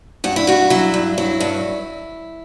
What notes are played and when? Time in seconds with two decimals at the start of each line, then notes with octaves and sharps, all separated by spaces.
0.24 G2 F#4
0.36 E4
0.47 G2 F#4
0.70 F#3 E4
0.94 G2
1.18 F#3 E4
1.40 G2